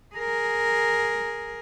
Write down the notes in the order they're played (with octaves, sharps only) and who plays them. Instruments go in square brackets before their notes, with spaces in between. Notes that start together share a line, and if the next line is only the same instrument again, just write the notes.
[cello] G#4 A#4